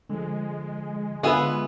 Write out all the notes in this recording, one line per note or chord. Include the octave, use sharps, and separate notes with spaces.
D3 F3 G#3
D3 B3 F4 G#4 B4 E5